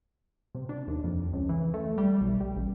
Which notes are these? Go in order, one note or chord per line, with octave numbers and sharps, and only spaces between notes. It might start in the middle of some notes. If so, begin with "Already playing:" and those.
C3
D4
D#2
F2
C#2
E3
A3
G3
B1
G3
A1